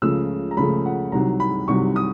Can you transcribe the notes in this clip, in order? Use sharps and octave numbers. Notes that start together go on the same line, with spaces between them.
C#2 C#3 F3 A3 E6
A#5
C#2 C#3 F3 A3 B5
F#5
C2 C3 D#3 F#3 A#5
B5
C2 C3 D#3 F#3 C#6
D#6